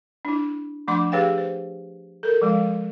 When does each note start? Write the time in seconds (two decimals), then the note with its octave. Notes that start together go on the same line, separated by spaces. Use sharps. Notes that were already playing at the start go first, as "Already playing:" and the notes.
0.25 D4 E4
0.88 F3 A3 D4 C6 D6
1.12 G4 G#4 B4 C#5 F5 G5
1.38 C5
2.23 A4 A#4
2.42 F3 G#3 F5